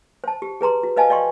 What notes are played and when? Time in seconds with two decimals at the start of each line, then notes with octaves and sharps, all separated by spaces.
0.24 C5 A5
0.42 G4
0.61 G#4 B4 A#5 C6
0.83 F#4
0.96 B4 C5 D#5 F5 G#5 A5
1.10 D5 D#5 F5 G5 C6 C#6